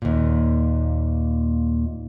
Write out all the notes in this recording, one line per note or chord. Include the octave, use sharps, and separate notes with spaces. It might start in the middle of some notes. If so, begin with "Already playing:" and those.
D#2 A#2